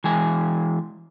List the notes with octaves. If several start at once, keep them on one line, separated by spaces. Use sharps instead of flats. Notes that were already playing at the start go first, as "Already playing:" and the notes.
E3 G#3 G#5